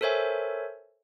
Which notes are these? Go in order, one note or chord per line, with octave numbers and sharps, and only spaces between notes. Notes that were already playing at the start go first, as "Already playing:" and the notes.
A4 A#4 C5 C#5 E5 G#5